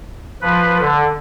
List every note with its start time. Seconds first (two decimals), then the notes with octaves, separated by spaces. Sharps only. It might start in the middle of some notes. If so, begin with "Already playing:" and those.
0.42 F3 B4
0.80 D3